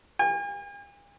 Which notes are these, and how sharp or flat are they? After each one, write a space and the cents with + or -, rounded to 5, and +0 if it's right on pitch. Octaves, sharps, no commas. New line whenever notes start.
G#5 -45